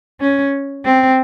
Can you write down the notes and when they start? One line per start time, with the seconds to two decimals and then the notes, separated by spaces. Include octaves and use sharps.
0.20 C#4
0.85 C4